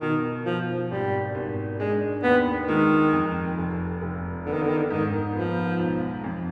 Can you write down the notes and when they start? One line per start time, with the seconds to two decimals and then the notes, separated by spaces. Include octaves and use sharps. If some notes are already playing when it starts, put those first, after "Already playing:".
0.01 B2 D#3
0.45 B2 F3
0.91 G#1 G3
1.35 G#1
1.80 G#3 D4
2.23 D#2 B3
2.68 D#3 G#3
3.13 F2
3.58 F1
4.02 F1
4.46 D3 B3
4.53 D#3
4.62 D3
4.69 D#3
4.77 D3
4.91 G#2 D#3
5.35 F3 B3
5.79 B1
6.24 F2